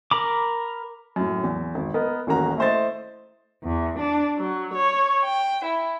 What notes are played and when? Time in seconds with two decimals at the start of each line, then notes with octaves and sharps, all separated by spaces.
0.11 A#4 A#5 B5 D6
1.16 F#2 A2
1.43 E2
1.75 G#1
1.94 B3 A#4 D#5
2.27 D#1 A1 A#3 C#4 F#4 A#5
2.58 A3 E4 C5 D#5 A6
3.64 E2
3.99 D4
4.37 F#3
4.74 C#5
5.24 G5
5.65 E4